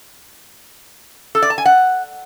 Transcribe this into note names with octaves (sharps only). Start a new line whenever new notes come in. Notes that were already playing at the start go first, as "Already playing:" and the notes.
A4
D5
A5
G#5
F#5